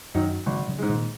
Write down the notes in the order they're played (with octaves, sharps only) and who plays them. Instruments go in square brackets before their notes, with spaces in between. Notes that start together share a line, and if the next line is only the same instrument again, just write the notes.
[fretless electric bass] F#2 [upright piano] D#3 F#3 D#4
[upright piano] G#1 [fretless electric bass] C#3 F#3
[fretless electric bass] C#3 F#3
[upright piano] G#2 G#3
[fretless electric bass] A#2 D#3